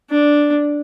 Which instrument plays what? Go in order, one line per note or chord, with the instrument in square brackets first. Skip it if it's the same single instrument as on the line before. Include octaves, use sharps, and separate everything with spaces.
[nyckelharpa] D4